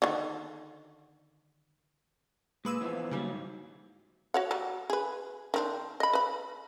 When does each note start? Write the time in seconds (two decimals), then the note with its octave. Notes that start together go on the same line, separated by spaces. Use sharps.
0.02 D3 D#3
2.65 A#2 G#3 B4 E6
2.81 E3 F3 B3
3.11 D#2 C#3 F#3 G3
3.30 G#2
4.34 F#4 C#5 F#5
4.51 F#3 G3
4.90 G#4 B4
5.54 D#3 C4 D4
6.00 D#5 B5
6.13 B4 B5